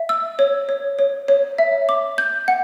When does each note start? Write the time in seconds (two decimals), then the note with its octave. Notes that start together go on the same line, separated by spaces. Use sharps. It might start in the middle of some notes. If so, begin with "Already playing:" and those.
Already playing: E5
0.09 E6
0.39 C#5
0.69 C#5
0.99 C#5
1.28 C#5
1.58 E5
1.89 D6
2.18 G6
2.48 F#5